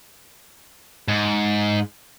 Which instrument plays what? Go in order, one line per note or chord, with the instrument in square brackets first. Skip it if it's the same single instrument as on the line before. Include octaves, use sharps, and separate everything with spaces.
[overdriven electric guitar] G#2